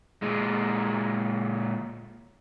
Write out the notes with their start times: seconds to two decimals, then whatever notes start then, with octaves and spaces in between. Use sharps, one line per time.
0.22 A#2 G#3